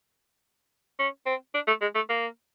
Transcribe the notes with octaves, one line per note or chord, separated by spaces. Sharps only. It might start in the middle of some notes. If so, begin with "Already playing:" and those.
C#4
C4
D4
A3
G#3
A3
A#3